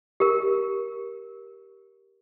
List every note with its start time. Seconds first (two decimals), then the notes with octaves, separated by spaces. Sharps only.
0.20 G4 A#4